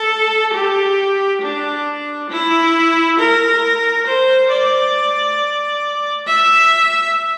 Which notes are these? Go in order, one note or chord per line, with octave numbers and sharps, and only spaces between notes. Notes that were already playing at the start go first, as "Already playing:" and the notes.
Already playing: A4
G4
D4
E4
A#4
C5
D5
E5